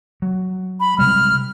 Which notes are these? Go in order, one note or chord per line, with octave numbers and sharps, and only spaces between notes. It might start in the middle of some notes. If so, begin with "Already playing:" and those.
F#3
B5
C3 G3 G#3 F6